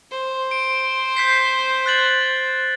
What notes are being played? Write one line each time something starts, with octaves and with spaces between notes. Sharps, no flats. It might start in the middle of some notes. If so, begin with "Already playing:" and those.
C5
D7
G6 B6 C7
F#6 A6 F#7